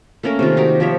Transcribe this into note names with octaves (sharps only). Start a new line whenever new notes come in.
A3 A#3 C#4 A#4
C3 D#3 F4
D#4 F#4 G4 A#4
F3 G4 C#5 E5